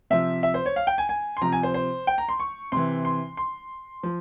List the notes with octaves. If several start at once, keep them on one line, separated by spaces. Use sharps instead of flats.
C3 F3 E5
E5
C5
C#5
F5
G5
G#5
G#5
C6
C3 F3 A#5
G#5
C5
C5
G5
A#5
C6
C#6
C3 E3 C6
C6
C6
F3